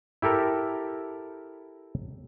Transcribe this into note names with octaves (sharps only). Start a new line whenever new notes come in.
E4 G4 A4 A#4